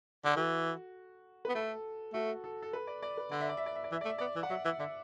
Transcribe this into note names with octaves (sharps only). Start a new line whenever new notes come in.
D3 A4
E3 F#4
B3 B4
A3 A4
A3 F#4
A4
A4
B4
D5
D5
B4
D3 D5
E5
D5
E5
D5
E5
D5
E3 E5
D5
A3
E5
B3 D5
E3
F#5
F#3 E5
E3 E5
D3 E5